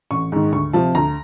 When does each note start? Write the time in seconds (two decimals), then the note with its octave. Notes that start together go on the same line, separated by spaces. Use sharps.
0.11 A1 C#6
0.32 G#2 D#3
0.52 D2 C#6
0.73 C3 F3 A5
0.95 D2 A#5